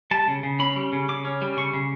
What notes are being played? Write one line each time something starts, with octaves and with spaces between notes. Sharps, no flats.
G3 A5
C#3
C#3
C#4 B5
G3
C#3
C#3 D6
C#4
G3
C#3 C#6
C#3